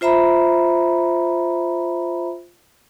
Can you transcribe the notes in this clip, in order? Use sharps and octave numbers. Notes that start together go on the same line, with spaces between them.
F4 C5 E5 A#5 B5